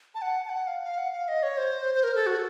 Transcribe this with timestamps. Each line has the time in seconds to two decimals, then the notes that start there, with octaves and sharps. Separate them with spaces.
0.15 A5
0.22 F#5
0.45 A5
0.49 F#5
0.67 F5
0.83 F5
0.98 F#5
1.12 F5
1.28 D#5
1.43 C#5
1.57 C5
1.94 C5
2.04 A#4
2.15 A4
2.26 F#4